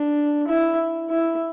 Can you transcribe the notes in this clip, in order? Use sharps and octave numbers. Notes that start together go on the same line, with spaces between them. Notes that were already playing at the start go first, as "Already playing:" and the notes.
Already playing: D4
E4
E4